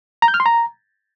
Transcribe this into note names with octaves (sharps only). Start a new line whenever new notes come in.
A#5
G6
F6
C6
A#5